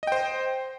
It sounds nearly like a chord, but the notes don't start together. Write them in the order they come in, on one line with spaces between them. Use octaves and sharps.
D#5 G5 C5